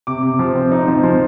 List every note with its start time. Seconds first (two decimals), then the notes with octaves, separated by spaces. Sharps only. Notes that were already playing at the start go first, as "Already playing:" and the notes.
0.07 C3 D6
0.23 C3
0.39 F3
0.55 C4
0.72 D#4
0.88 F3
1.03 F3